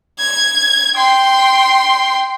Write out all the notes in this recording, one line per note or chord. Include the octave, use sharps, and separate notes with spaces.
G#6
G5 C6